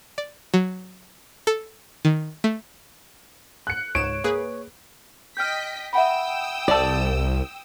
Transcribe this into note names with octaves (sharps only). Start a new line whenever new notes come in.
D5
F#3
A4
D#3
A3
F#6 C#7
C#2 G#2 C#5 D7 E7
A#3 G#4 B4
D#5 G5 F6 G6 B6
E5 F#5 G5 B5 D#6 E6
C2 A4 D5